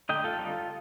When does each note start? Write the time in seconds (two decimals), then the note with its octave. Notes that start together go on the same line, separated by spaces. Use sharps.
0.09 D3 A3 D#4 D#5 G5
0.24 F4 A4
0.39 D3 G3 C4 D#4